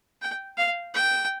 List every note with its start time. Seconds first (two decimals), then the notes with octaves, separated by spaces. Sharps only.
0.22 G5
0.58 F5
0.94 G5